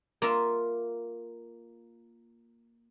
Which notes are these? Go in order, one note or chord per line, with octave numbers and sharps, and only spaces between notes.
A#3 F4 A#4 E5